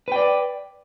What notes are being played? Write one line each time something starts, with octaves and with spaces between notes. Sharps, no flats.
B4 D5 G5